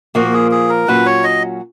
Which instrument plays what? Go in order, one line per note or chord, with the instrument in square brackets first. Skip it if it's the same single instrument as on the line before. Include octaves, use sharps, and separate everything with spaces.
[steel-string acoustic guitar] A#2 F3 A#3 [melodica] F#4
[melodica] G#4
G#4
A#4
[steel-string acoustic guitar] A#2 F#3 C#4 F#4 [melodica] B4
[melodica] C#5
D#5